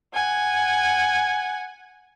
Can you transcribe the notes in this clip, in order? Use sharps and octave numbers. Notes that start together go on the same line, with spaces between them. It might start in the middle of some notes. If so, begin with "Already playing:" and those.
F#5 G#5